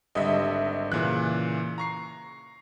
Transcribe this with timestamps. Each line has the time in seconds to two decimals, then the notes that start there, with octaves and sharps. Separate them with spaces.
0.15 G#1 D3 G3 D#5 E5
0.92 A#2 C#3 E3 F#6
1.78 A#5 C#6 C7